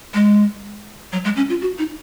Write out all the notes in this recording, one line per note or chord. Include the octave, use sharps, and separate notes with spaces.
G#3
F#3
G#3
C#4
F4
F#4
D#4